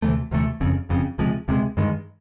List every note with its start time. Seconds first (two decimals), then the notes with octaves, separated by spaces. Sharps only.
0.02 D2 C3 E3 A3
0.31 D2 C3 E3 A3
0.60 F#1 F2 C#3
0.89 F#1 F2 C#3
1.18 C#2 C3 F3 G#3
1.48 C#2 C3 F3 G#3
1.77 G2 D#3 G#3